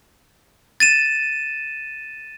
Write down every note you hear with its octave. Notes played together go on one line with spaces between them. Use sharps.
A6 D#7 E7